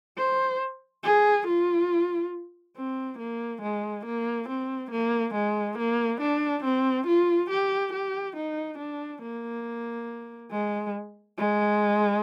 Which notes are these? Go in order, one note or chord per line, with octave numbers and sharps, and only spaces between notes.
C5
G#4
F4
C4
A#3
G#3
A#3
C4
A#3
G#3
A#3
D4
C4
F4
G4
G4
D#4
D4
A#3
G#3
G#3